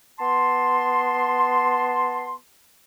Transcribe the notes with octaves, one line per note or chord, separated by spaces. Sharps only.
B3 A5 C6